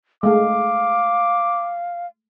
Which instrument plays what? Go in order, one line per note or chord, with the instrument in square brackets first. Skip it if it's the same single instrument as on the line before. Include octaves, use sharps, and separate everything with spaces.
[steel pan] G#3 A3 [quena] F5 [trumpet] D6